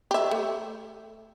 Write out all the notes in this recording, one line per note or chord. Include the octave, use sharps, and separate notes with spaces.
G4 E5
A3